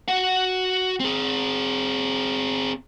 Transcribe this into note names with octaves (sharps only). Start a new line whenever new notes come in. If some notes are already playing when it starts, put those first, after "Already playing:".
F#4 F#5
C4 G#4